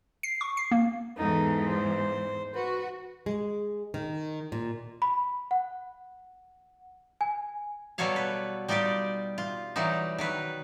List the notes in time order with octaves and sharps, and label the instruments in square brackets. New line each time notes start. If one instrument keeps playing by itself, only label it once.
[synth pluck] C7
C#6
C7
A#3
[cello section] E2 G#2 E3 [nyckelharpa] D#4 A4
[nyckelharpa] C5
[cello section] F#4 [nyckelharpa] B4
[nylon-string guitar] G#3
D#3
A#2
[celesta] B5
F#5
G#5
[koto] B2 F#3 G3 A4 C#5 F5
B4
G3 D#4 F4 G4 D5
F4
E3 F#3 G3 D#4
D#3 F#3 B4